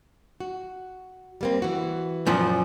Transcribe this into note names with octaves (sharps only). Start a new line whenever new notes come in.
F#4
G3 A#3 C4
E3 F#4
F#2 A#2 F3